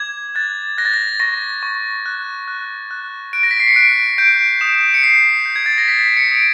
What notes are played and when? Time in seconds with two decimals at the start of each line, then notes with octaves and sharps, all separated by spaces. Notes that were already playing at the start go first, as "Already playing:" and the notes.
Already playing: D6 G#6
0.35 F#6 A6
0.78 F#6 A#6
0.85 A6
0.94 A#6
1.20 C#6 A#6
1.63 C#6
2.06 F#6
2.48 F#6
2.91 F#6
3.33 F#6 D7
3.43 A#6
3.51 B6
3.60 C7
3.68 C#7
3.76 F#6 D7
4.18 G6 D7
4.61 D#6 E7
4.94 C#7
5.03 G6 C7
5.46 G6
5.56 G#6
5.66 A6
5.78 A#6
5.88 G6 B6
6.07 D7
6.17 C#7
6.31 D#6 D7